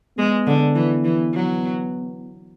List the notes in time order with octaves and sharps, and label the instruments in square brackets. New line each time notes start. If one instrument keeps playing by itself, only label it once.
[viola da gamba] G#3 [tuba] B3
[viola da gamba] D3
E3
E3
F#3